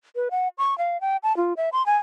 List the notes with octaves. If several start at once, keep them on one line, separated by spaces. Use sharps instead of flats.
B4
F#5
C#6
F5
G5
A5
F4
E5
C6
G#5